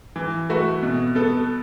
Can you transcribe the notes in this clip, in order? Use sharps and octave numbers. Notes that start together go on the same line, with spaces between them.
E3
A3 F#4 B4 E5
B2
B3 A4